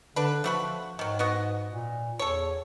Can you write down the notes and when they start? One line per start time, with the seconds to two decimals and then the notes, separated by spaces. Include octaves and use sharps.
0.16 D3 D4 B4
0.44 F3 A3 F#4 B5
0.99 G#2 D#3 F#3
1.19 B3 F#4 D#5
1.71 A#2
2.19 E2 A4 C#5